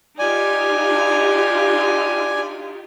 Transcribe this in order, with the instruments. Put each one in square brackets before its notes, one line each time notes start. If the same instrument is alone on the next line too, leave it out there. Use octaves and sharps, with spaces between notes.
[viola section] D#4 F4 G4 [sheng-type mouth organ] D5 G#5